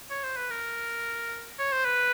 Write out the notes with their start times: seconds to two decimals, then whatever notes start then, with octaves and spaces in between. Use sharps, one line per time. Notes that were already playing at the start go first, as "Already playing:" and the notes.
0.10 C#5
0.24 C5
0.37 B4
0.50 A#4
1.59 C#5
1.72 C5
1.85 B4